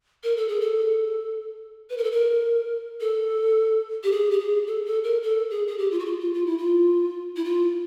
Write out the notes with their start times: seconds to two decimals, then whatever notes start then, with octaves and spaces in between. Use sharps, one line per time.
0.24 A#4
0.37 A4
0.48 G#4
0.61 A4
1.90 B4
1.97 A#4
2.04 A4
2.11 A#4
3.00 A4
4.03 G4
4.12 G#4
4.31 G4
4.39 G#4
4.67 A4
4.85 A4
5.04 A#4
5.23 A4
5.50 G#4
5.67 G#4
5.78 G4
5.91 F4
5.99 F#4
6.05 F4
6.20 F4
6.33 F4
6.46 E4
6.58 F4
7.36 E4
7.44 F4